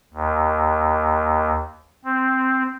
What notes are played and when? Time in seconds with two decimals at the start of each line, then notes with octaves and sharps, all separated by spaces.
0.14 D#2
2.04 C4